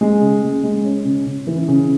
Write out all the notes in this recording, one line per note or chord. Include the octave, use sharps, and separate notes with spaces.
G#3
C#3
G#3
G#3
C#4
C#3
C#3
E3
C#3